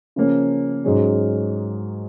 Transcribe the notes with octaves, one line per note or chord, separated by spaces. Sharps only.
C#3 F3 A#3 C#4
G#2 F#3 C#4 G#4